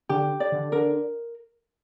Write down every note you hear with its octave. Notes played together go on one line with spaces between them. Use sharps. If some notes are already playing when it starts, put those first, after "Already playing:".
D3 G4
D5
D3
D3 A#4